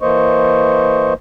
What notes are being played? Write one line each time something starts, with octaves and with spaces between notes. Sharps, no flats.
E3 A#3 C5 D#5 C#6